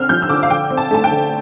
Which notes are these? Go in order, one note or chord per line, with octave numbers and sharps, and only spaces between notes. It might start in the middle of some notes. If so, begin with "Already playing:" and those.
Already playing: D3 C4 F6
F3 G6
E6
D3 D6
F5
D3 G5
C4
A5
A3 A5
G5
D3